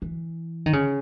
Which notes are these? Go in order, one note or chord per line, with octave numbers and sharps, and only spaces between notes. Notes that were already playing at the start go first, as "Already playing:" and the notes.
E3
D#3
C#3